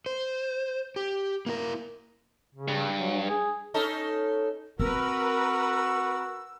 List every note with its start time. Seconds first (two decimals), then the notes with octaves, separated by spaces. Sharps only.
0.06 C5
0.96 G4
1.46 A#3 E4 A#4
2.55 C#3
2.68 G2
2.98 F#3
3.26 G#4
3.74 C#4 D#4 A4
4.80 C4 F#4 A#4 B4 E6